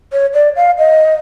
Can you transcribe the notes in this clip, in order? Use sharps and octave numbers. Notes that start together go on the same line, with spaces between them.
C#5
D5
F5
D#5